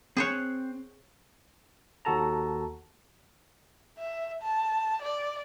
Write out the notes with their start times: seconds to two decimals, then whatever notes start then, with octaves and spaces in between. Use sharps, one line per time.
0.17 C4 G#4 C5 C#5 F#6
2.05 D#2 F#4 A4 A5 A#5
3.98 E5
4.42 A5
5.02 D5